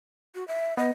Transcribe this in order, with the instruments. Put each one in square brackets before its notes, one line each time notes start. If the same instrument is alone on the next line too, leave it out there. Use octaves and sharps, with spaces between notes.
[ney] F#4
E5
[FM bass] B3 [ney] D#5